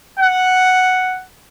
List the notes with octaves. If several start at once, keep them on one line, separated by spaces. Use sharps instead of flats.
F#5